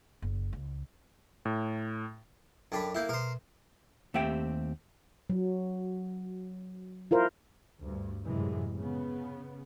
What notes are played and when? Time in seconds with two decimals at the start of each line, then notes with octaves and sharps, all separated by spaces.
0.22 F#1
0.53 C#2
1.45 A2
2.72 F#2 D4 A4 G5 B5
2.95 A#3 E4 E5 G6
3.09 B2 A#4 C5
4.14 D#2 A3 C4 G4 E5 G5
5.30 F#3
7.11 E4 F4 A#4 C5
7.79 D2 G2
8.24 F#2 A2 C3 E3 G#3
8.75 C#3 B3